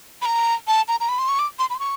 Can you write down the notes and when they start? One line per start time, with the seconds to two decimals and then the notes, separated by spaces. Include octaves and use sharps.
0.22 B5
0.26 A#5
0.68 A5
0.88 A#5
1.00 A#5
1.09 B5
1.19 C6
1.29 C#6
1.39 D6
1.59 C6
1.70 B5
1.75 C6
1.79 C#6